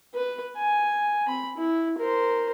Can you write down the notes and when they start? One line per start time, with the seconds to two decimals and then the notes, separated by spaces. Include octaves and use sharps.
0.14 B4
0.57 G#5
1.26 C4 B5
1.57 E4
1.98 A#4 C5